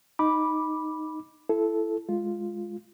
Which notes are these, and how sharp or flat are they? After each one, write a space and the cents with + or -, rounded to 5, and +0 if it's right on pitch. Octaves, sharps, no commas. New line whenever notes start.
D#4 +0 B5 -10 D6 +0
E4 +25 A4 -10
G#3 +0 F4 +0